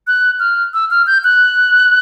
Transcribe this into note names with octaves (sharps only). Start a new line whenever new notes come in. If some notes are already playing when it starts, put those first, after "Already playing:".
F#6
F6
E6
F6
G6
F#6